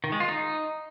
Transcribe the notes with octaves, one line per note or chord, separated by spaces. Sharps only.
D#3
G#3
F4
D#4